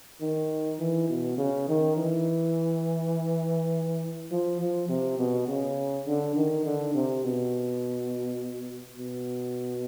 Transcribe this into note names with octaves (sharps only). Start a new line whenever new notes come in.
D#3
E3
B2
C#3
D#3
E3
F3
F3
C3
B2
C#3
D3
D#3
D3
C3
B2
B2